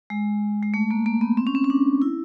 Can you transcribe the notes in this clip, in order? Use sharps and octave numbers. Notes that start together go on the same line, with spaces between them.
G#3
G#3
A3
A#3
A#3
B3
C4
C#4
C4
C#4
D4
E4